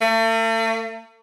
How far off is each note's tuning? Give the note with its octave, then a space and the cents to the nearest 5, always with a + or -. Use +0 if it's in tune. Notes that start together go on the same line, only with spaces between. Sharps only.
A3 +40